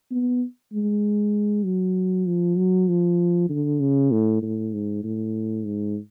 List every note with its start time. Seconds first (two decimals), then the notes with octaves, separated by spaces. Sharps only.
0.11 B3
0.73 G#3
1.65 F#3
2.26 F3
2.58 F#3
2.88 F3
3.49 D3
3.80 C#3
4.11 A2
4.42 A2
4.73 G#2
5.04 A2
5.65 G#2